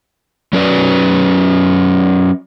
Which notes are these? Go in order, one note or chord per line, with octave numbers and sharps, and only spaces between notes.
F#3 C#4 B4 D5